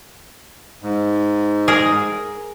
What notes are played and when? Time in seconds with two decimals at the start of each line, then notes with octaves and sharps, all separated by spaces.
0.83 G#2
1.68 G#4 A#4